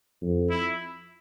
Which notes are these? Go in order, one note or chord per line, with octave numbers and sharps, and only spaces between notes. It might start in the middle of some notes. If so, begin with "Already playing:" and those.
F2
E4